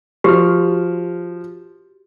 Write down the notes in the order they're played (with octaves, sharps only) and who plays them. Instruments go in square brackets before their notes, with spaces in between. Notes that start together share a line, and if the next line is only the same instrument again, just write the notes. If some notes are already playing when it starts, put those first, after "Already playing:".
[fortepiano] F3 F6 [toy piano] F#4 G4